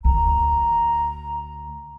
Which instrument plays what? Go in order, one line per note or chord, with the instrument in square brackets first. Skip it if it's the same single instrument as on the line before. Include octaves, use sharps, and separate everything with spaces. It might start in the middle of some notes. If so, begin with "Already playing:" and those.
[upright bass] D2 [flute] A#5